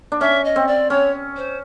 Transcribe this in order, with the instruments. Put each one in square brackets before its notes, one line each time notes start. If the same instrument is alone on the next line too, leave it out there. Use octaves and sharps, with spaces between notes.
[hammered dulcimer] D4
[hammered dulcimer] C#4 [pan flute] E5
[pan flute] D#5
[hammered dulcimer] C4
[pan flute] D5
[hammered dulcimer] C#4 [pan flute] C#5
[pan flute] C5